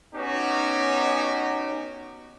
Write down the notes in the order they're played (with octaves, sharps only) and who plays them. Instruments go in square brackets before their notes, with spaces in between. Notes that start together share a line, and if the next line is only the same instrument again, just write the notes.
[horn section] B3 C#4 D#4 F#4 G4